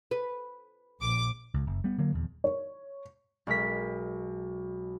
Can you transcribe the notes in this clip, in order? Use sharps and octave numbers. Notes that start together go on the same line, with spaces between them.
B4
A#1 D6
C#2
F#1
G3 B3
D3 F#3 A#3
D#1 E2
C#5
B1 G#3 A#4 B6